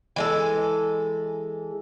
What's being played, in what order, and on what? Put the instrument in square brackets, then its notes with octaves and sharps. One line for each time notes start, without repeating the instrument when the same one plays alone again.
[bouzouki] E3 G#3 A4